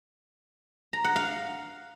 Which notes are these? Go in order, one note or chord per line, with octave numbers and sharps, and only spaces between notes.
A#5
F#5
F5